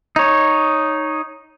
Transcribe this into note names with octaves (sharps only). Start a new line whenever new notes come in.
D#4 C#5